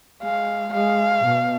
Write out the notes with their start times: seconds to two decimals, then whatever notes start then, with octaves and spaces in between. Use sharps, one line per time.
0.23 G#3 F5
0.73 G#3 F5
1.25 B2